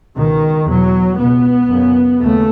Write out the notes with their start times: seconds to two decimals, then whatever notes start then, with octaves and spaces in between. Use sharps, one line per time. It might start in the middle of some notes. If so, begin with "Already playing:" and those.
0.15 C#2 B2 D#3
0.66 E2 B2 F#3
1.18 C#2 B2 B3
1.69 F#2 C#3
2.21 D#2 C#3 A3